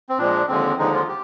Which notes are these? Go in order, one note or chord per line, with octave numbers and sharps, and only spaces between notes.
C4
A#2 F3 G#3 D4
D#2 D3 F3 G#3 C4
D#2 D3 F3 G#3 D#4
F4
G4